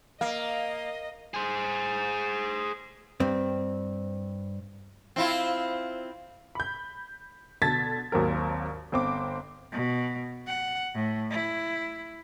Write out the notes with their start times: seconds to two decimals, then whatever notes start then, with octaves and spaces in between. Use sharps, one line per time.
0.21 A#3 D#5 F5
1.34 G#4 C5
3.20 G2 C4
5.16 C4 E4 F4
6.55 B5 G6
7.62 B2 D3 A5 G#6 A6 B6
8.12 G#1 D#2 F#3 C4 A#4
8.92 G1 C4 D6
9.72 B2
10.47 F#5
10.95 A2
11.31 E4